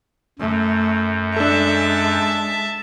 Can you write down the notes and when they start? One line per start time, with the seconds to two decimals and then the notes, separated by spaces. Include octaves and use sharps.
0.39 F#2 A3
1.36 G#3 D4 A4 E5 A5